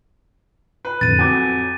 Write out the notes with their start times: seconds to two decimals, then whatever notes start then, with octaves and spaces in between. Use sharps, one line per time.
0.85 B4
1.01 F2 A2 D3 A6 D#7
1.19 F2 F#3 G#5 D6